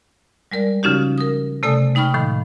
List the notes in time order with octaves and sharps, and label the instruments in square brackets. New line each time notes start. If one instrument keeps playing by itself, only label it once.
[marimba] G3 G#3 A#4 D5
C#3 F3 C#4 D#4 F#4 G4
A#4 D#6
C3 A3 A4 D5 G#5 D#6
G#3 D#4 G5 B5 C#6 F6
A2 D#3 F3 B5